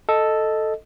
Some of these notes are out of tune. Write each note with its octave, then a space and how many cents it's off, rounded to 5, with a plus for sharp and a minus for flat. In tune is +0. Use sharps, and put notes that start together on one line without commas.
A4 +0 D#5 +0